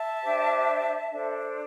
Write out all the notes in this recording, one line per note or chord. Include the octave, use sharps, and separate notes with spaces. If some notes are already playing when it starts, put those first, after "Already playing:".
Already playing: E5 A5
D4 G4 C5
D4 A4 C5